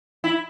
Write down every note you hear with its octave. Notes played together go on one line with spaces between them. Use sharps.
E4